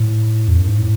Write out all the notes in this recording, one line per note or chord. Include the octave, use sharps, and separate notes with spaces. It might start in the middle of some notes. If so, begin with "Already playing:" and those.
Already playing: A2
E2
F#2
G#2
A2